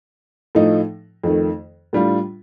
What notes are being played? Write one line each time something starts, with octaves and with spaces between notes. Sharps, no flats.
A2 F3 A3 D#4
F2 D#3 A3
A2 G3 D4 F4